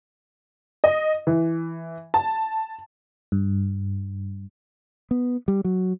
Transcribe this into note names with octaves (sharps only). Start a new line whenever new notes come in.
D#5
E3
A5
G2
B3
G3
F#3